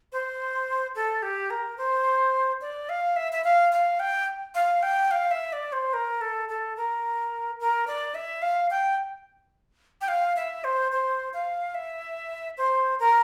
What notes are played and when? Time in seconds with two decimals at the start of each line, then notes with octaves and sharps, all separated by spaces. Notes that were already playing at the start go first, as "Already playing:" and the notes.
0.12 C5
0.95 A4
1.23 G4
1.50 A#4
1.78 C5
2.61 D5
2.89 F5
3.16 E5
3.33 E5
3.44 F5
3.72 F5
4.00 G5
4.55 F5
4.83 G5
5.11 F5
5.31 E5
5.53 D5
5.73 C5
5.94 A#4
6.21 A4
6.49 A4
6.77 A#4
7.60 A#4
7.87 D5
8.15 E5
8.42 F5
8.71 G5
10.01 G5
10.08 F5
10.36 E5
10.64 C5
10.92 C5
11.34 F5
11.74 E5
12.58 C5
13.00 A#4